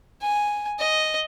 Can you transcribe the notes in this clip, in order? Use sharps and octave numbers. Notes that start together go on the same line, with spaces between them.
G#5
D#5